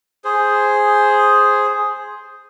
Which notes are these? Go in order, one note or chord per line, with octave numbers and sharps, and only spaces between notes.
G#4 C5